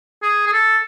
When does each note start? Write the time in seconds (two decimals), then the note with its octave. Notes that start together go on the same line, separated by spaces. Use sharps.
0.23 G#4
0.47 G#4
0.53 A4